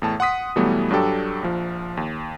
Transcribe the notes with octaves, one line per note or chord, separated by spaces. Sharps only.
E2 A2 A5
F#5 C6 D#6 B6
B2 E3 F#3 G3 A3 B3
G2 F#3 D4 G4 A4 G5
A#1 F3
D#2